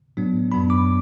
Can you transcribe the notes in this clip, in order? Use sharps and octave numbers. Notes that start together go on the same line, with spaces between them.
A2 F#3 B3 D4
F#2 F#3 B3 D4 B5
D6